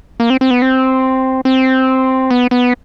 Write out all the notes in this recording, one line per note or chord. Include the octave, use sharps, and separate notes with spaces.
A#3
C4
C4
B3
C4
C4
B3
B3